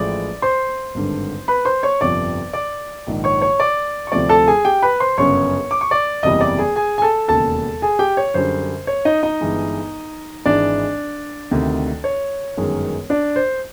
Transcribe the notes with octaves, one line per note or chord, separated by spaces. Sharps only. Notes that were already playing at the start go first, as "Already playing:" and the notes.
Already playing: A1 A2 F3 G#3 D5 D6
C5 C6
G#1 G2 D3
B4 B5
C5 C6
C#5 C#6
G1 F2 C3 F3 D5 D6
D5 D6
A#1 G#2 D#3
C#5 C#6
C#5 C#6
D5 D6
C#6
D2 C3 F3 A3 D5 D6
A4 A5
G#4 G#5
G4 G5
B4 B5
C5 C6
G1 F#2 C#3 C#5 C#6
D6
C#6
D5 D6
F#1 E2 C3 E3 G3 D#5 D#6
D5 D6
G#4 G#5
G#4 G#5
G#5
A4 A5
E1 D#2 C#3 A4 A5
G#4 G#5
G4 G5
C#5
F#2 D3 G3 C5
C#5
D#4 D#5
D#4 D#5
G1 G2 E3 G#3
G#1 G#2 E3 G#3 D4 D5
D2 C3 D#3
C#5
G1 F#2 D#3 G#3
D4 D5
C5